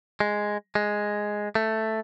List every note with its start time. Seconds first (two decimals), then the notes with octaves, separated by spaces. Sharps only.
0.20 G#3
0.75 G#3
1.55 A3